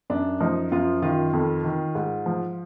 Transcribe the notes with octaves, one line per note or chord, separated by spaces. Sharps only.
F#2 D4
F3 D#4
F#2 F4
D#3 F4
F2
D#3
G#2
F3